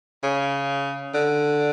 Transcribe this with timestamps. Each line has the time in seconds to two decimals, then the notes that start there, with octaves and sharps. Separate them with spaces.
0.23 C#3
1.14 D3